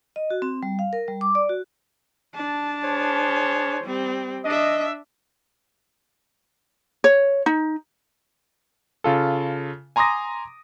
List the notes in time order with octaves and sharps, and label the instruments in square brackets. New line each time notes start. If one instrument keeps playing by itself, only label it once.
[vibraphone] D#5
F#4
C4
G3
F5
A#4
G3
D6
D5
F#4
[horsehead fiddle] D4 A5
[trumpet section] G#4 C5 C#5
[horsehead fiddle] G3 C4
[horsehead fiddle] D4 E5 [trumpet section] D#5
[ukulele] C#5
D#4
[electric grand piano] C#3 F4 A4
G#5 A#5 C6 D6 D#6 A#6